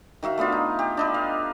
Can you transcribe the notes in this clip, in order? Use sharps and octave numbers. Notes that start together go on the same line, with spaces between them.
D#3 F#4 E5 F5
A3 B3 D4 F4
D#4
G4
D4 D#4 B4
F5